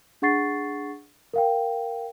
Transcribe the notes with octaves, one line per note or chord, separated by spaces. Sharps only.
D4 G#4 F#5 C#6 A6 C7
A#4 F5 G5